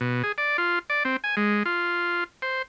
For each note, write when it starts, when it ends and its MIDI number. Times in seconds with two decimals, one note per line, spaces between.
0.01 0.23 47
0.23 0.32 68
0.38 0.57 74
0.58 0.79 65
0.90 1.03 74
1.05 1.16 60
1.24 1.35 80
1.37 1.63 56
1.65 2.24 65
2.42 2.62 72